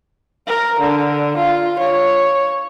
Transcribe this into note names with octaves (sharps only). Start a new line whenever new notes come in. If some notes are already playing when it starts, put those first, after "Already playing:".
A#4
D3
F4
C#5